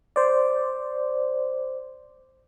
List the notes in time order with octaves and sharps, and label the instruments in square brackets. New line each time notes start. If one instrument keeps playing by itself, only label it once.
[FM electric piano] C5 D5